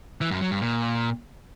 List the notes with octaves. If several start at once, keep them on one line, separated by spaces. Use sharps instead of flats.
E3
F#2
F#3
G2
A#2